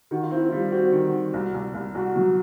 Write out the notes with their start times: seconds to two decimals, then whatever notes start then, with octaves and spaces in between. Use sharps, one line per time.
0.11 D#3 F#4
0.23 F4
0.31 C4 E4
0.49 G3 F4
0.71 C4 F#4
0.92 D#3
1.13 D#3
1.34 C2
1.54 C2
1.74 C2
1.95 C2 F#4
2.16 F#3